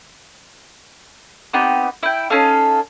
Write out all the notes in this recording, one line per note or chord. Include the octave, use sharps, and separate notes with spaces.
B3 C4 D#4 G4
E4 G5
C#4 D#4 A4 F5